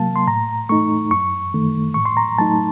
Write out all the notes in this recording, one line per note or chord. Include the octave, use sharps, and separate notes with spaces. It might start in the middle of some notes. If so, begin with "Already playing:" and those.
Already playing: C3 F#3 A#3 F5 A5
C6
A2 A#5
A3 D#4 C#6
F#2 C#6
D#3 A3
A2 C#6
C6
A#5
F#3 A3 D#4 A5